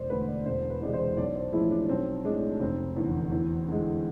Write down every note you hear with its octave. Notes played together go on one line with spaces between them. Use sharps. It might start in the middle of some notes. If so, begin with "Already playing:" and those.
Already playing: E1 C5 D5
D2 D3 B4
D5
E1 C5
B4
E2 C3 G#3 D5
C5
B1 D5
C5
A2 F3 G#3 E4
D4
B1 C4
A2 G#3 D4
F1 C4
E2 D3
E2
D3 G#3